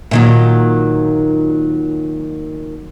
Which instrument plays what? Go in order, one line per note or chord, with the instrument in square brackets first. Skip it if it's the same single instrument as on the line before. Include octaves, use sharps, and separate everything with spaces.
[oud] A#2 D#3 F#3